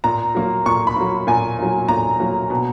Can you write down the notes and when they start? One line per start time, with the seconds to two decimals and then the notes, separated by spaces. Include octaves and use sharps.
0.04 A#2 A#5
0.35 F#3 A#3
0.66 A#2 C#6
0.87 B5
0.96 F#3 A#3
1.27 A#2 G#5
1.58 F#3 A#3
1.88 A#2 A#5
2.20 F#3 A#3
2.50 B2